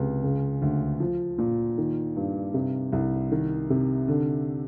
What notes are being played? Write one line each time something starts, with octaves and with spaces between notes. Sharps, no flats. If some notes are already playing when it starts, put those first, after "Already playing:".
Already playing: C#2 C3
C#3
D2
F3
A#2
D#3
G2
C3
C2
D#3
C3
D3